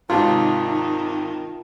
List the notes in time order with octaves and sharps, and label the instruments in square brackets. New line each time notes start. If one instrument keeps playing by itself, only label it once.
[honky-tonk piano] G#1 G#2 C3 [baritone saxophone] D#3 [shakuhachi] D#4 [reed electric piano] F4 A5